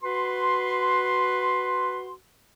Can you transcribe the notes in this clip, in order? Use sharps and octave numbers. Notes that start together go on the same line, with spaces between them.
F#4 B4 C6